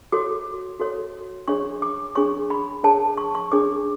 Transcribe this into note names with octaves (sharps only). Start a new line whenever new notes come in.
F#4 A4 C#5 D6
F#4 A4 C#5
D4 G#4 C#5 C#6
D6
D4 G#4 C#5 C#6
B5
D4 G#4 C#5 A5
C#6
C#6
D4 G#4 C#5 D6